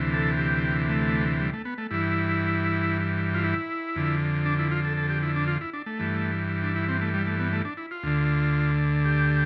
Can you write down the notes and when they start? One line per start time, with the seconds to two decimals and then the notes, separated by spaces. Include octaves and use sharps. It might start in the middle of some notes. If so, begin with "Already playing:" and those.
Already playing: D2 C3 E3
0.13 A4
0.38 G4
0.89 A3
1.40 G3
1.53 A3
1.65 B3
1.78 A3
1.91 G2 E3 E4
3.34 F4
3.44 E4
3.96 F2 D3
4.46 D4
4.59 E4
4.71 F4
4.85 A4
4.97 A4
5.10 G4
5.23 E4
5.36 D4
5.48 F4
5.61 E4
5.73 D4
5.86 A3
5.99 G2 E3
6.63 D4
6.76 E4
6.89 C4
7.01 A3
7.14 G3
7.27 A3
7.40 B3
7.52 A3
7.65 D4
7.77 E4
7.91 F4
8.03 D2 D3
9.05 G4